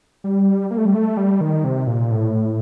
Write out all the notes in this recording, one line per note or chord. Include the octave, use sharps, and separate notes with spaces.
G3
A#3
A3
G3
A3
G3
D#3
C3
A#2
A2